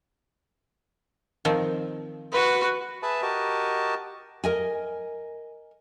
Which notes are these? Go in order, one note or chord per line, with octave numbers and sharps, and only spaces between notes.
D#3 F3 C4
F#4 B4
G#4 B4 E5 A5 B5
F#4 G4 A#4 D#5 A5
A#4 D#5 G#5